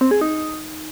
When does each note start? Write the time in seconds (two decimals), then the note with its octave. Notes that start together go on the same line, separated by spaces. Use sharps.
0.01 C4
0.11 G#4
0.21 D#4